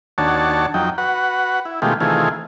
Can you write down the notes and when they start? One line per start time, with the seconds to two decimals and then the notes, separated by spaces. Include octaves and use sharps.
0.18 D#2 D4 F#4 C#5 A5
0.74 F2 F#3 D#4 G5
0.98 F#4 B4 F#5
1.65 E4
1.82 B2 D#3 G#3 A3 F4 G4
2.00 C3 D#3 E3 A3 F4 G#4